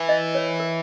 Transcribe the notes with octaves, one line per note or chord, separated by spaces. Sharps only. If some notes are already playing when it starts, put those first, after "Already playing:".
Already playing: E3
D#5
C#5
A#4